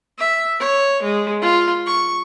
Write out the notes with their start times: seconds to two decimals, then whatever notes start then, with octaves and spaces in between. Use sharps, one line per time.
0.18 E5
0.60 C#5
1.02 G#3
1.41 F4
1.86 C#6